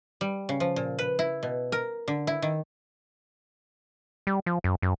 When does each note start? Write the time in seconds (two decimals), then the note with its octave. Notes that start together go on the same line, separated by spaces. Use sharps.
0.21 G3
0.49 C#3
0.60 F3
0.76 A#2
0.99 B4
1.19 E4
1.43 B2
1.72 A#4
2.08 D3
2.27 E4
2.42 D#3
4.27 G3
4.46 F3
4.64 F#2
4.82 F#2